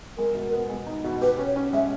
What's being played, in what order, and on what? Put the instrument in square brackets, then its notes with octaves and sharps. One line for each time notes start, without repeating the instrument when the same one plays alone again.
[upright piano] G#3 [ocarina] A#4
[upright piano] B2
B3
G#3
D#4
B2
[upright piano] G4 [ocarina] B4
[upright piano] C#4
[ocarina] C#5
[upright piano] C#4
[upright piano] G#3 [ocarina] E5